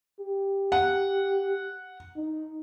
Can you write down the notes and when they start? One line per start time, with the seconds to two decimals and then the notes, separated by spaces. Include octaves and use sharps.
0.20 G4
0.72 F#5
2.16 D#4